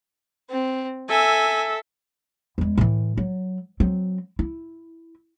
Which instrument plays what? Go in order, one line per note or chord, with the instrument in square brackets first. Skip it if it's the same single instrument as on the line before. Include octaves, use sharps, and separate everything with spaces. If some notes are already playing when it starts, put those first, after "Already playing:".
[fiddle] C4
[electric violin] A4 E5 [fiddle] G#5
[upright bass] E2 G#3
A2 E3
F#3
F#3 C4
E4